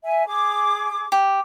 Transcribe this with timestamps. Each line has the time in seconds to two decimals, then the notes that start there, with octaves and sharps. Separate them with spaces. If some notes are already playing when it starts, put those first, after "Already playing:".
0.04 E5 G#5
0.26 G#4 D6
1.12 G4